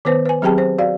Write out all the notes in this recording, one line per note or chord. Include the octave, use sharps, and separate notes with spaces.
D#3 B3 B4 C5
B4 G#5
F#3 C4 G4 G#4 G5 A5
C5
F#4 D5 F5